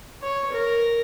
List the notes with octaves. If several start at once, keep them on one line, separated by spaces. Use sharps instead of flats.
C#5
A#4